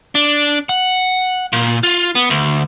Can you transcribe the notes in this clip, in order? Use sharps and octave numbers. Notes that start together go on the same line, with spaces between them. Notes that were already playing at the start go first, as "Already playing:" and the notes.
D4
F#5
A#2
F4
B3
D2